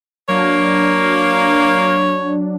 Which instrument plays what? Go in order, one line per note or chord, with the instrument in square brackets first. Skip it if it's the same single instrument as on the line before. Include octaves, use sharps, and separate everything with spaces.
[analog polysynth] F#3 D4 [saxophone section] A#3 [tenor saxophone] C#5